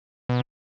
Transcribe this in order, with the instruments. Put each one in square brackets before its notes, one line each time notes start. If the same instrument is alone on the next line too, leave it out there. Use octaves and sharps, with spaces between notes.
[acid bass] B2